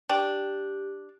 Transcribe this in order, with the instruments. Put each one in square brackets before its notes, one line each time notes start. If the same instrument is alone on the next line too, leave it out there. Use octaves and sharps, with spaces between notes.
[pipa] D4 [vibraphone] G4 [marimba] G5